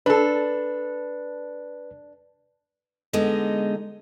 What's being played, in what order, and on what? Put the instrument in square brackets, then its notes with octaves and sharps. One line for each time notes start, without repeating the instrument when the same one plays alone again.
[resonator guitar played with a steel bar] D4 A4 [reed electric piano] B4
[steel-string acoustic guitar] D3 G#3 B3 D#4